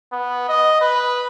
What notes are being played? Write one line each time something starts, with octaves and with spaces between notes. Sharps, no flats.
B3
D#5
B4